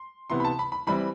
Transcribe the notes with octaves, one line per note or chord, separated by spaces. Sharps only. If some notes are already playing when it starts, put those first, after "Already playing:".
Already playing: C6
C3 E3 B3 E4 C6
B5
A5
B5
B5
E3 G3 C4 E4 B5